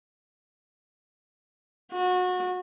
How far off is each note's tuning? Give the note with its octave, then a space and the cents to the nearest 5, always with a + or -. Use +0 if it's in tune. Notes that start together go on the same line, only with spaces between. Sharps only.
F#4 -25